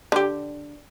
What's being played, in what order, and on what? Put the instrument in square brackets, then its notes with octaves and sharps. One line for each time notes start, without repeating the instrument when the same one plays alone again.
[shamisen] D3 G4